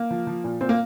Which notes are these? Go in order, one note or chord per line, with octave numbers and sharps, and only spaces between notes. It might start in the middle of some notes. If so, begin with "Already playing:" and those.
Already playing: A#3
F3
F3
A#2
A#2 C4
A#3